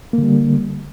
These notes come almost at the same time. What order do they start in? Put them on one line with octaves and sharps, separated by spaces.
A#3 D3 G3